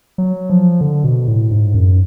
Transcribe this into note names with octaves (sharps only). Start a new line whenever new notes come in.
F#3
F3
D3
B2
A2
G#2
F#2